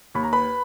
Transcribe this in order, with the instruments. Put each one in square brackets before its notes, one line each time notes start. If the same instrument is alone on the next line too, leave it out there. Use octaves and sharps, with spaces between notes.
[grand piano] D#2 B5
A#5
B4 B5